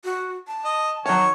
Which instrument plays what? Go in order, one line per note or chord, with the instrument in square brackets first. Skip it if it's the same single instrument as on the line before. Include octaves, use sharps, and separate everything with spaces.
[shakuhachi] F#4
A5
[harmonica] D#5
[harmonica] D#3 C#5 [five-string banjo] F#3 A5